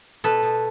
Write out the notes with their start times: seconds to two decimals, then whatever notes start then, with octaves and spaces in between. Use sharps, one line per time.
0.24 B2 A4 B4
0.43 B2